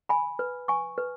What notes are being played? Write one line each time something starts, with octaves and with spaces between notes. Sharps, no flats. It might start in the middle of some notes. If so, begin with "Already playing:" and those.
G#5 B5
B4
G#5 C#6
B4